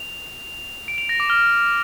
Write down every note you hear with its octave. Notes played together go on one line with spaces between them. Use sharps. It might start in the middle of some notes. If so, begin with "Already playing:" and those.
Already playing: F7
D7
F7
A#6
D6
F6